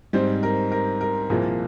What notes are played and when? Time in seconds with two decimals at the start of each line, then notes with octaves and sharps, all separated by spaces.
0.13 G#2 G3 C4 C5
0.43 A#4
0.72 A#4
1.01 A#4
1.29 C2 A#2 F3 A#3 G#4